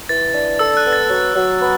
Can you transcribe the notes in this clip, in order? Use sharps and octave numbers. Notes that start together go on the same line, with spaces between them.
E3 A6
D4
A4 E6
F#6
B3
A6
F#3
F#3
B3